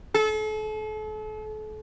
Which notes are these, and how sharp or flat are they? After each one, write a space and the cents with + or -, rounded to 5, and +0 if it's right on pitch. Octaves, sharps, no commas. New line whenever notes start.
A4 -40